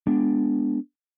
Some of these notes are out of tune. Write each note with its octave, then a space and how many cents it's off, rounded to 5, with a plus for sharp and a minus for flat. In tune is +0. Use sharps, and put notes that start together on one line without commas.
G#3 +0 B3 +0 D4 +0